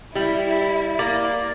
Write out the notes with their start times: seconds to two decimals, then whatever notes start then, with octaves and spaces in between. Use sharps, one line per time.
0.15 G3 E4
0.99 A#3 D5